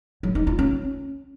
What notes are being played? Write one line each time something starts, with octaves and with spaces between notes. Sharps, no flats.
F#3
D#4
F4
C#4